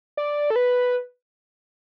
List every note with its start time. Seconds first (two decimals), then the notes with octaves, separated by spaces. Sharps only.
0.17 D5
0.50 A4
0.56 B4